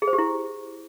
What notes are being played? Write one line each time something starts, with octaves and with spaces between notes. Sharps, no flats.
G#4
C5
G4
E4